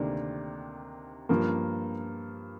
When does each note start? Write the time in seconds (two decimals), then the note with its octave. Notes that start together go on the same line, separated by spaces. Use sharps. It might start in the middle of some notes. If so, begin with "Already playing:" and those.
Already playing: D2 C3 D#3 A#3 D4
1.29 G2 F3 A#3